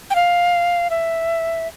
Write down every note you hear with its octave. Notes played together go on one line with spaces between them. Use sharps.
G5
F5
E5